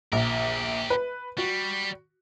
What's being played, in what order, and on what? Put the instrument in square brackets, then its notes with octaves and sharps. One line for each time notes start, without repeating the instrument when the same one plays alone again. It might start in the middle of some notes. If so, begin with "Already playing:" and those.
[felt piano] A#1 [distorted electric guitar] G4 A#4
[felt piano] B4
[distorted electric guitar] G3 [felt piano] F#4